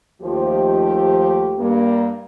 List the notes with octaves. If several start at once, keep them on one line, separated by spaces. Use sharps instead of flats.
D#2 F3 A3 G4
G2 A#3